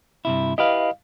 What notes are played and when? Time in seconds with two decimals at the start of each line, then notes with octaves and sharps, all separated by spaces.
0.25 G2 C3 E4
0.58 E4 G4 B4 D#5 F5